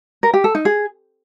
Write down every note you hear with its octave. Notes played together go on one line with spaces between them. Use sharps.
A#4
G4
A4
D#4
G#4